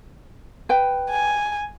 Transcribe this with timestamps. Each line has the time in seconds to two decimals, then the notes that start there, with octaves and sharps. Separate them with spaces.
0.69 B4 G5
1.10 G#5